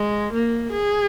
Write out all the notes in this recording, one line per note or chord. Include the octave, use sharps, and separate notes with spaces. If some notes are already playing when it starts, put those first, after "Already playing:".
Already playing: G#3
A#3
G#4